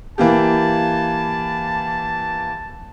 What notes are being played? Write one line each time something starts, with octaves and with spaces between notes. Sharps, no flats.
E3 A#3 G4 A5